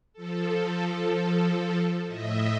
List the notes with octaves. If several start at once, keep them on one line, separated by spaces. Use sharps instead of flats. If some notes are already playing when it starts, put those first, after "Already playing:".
F3 A4
A2 D#5 E5